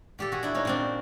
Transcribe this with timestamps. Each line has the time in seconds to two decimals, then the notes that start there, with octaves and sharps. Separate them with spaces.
0.19 A#2 G4 A4
0.32 F#4 G#4
0.43 D4 E4
0.55 C#4 D#4
0.65 A#2 C4 D4